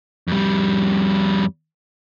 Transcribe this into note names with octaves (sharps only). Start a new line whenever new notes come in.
F2 G3